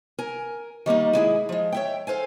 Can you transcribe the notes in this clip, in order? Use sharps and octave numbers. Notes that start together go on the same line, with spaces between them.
A#4 G#5
D#3 G3 A#3 D#4
G#3 E4 G#4
F3 G#3
C#5 E5 G5
A4 C5 F5 G#5